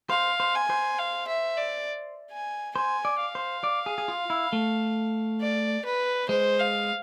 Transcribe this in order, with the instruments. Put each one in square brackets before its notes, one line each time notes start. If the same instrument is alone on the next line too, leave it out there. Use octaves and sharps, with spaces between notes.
[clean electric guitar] C5 [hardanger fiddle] F5
[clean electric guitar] C5
[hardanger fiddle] G#5
[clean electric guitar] C5
[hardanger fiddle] F5
E5
D5
G#5
[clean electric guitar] C5 [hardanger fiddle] G#5
[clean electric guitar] D5
[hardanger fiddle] F5
[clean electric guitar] C5
D5
G#4
G#4
F4
E4
A3
[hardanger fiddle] D5
B4
[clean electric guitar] G#3 [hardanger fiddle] C5
[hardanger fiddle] F5